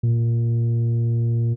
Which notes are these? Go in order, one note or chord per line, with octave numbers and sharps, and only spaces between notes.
A#2